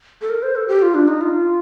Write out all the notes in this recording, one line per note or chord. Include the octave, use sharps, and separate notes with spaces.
A4
A#4
C5
A4
G4
F4
D4
D#4
F4